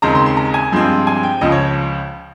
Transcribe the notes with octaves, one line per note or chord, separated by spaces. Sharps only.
D#2 C#3 G#3 C4 A#5
C6
C6
A#5
G#5
G2 F3 G#3 C4
G#5
G5
C#2 C#3 F3 D#5
C#5